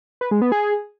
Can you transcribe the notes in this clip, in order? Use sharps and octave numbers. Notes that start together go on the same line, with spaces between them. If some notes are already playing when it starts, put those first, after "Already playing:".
B4
G#3
B3
G#4